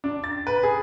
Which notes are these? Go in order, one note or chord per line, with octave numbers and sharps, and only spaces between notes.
D4
A6
B4
G#4